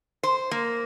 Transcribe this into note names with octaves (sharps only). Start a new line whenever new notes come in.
C5
A#3